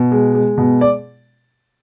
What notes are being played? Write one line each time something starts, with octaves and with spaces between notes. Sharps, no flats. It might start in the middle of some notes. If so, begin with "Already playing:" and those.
Already playing: B2
G#3
G#3
B2
D5